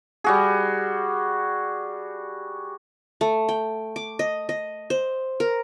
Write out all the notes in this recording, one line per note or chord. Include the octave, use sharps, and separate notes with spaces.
G3 F#4 G#4
A3
G5
D6
D#5
D#5
C5
A#4